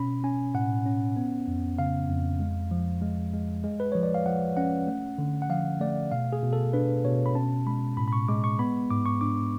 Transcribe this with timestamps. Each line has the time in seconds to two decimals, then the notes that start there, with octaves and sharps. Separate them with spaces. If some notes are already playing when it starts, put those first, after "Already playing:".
Already playing: B2 C#4 B5
0.24 C#4 G#5
0.55 A2 F#5
0.86 C#4
1.16 B3
1.47 F2
1.79 C#3 F5
2.10 F2
2.40 G#3
2.71 F3
3.02 G#3
3.33 G#3
3.64 G#3
3.80 B4
3.92 F3 C#5
4.03 D5
4.14 F5
4.26 F3 F#5
4.57 C#4 F#5
4.87 A3
5.18 D3
5.42 F#5
5.49 F3 F5
5.81 A3 D5
6.12 B2 F5
6.33 G#4
6.43 B2
6.53 A4
6.73 D4 B4
7.04 B2 C#5
7.26 B5
7.35 C#4 A5
7.67 G#3 B5
7.97 A2 B5
8.08 B5
8.13 C#6
8.28 G#3 D6
8.44 C#6
8.59 B3 B5
8.91 G#2 D6
9.06 C#6
9.21 D4 D6